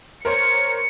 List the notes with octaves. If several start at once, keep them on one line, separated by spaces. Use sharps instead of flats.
A#4 C5 C#5 C#7